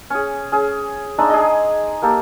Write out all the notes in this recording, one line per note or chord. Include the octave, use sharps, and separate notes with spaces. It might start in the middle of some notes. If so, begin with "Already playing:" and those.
C#4 G#4
C#4 G#4
G#3 D4 D#4 E5
G#4 D#5
A#3 G4 A4